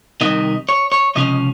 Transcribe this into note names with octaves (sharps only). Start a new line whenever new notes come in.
C2 C3 D#3 D#5
C#5
C#5
C#2 C3 F3 C#4 D#5